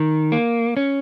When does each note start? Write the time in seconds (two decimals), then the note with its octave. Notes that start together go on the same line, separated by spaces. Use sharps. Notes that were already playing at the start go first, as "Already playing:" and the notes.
Already playing: D#3
0.32 A#3
0.77 C#4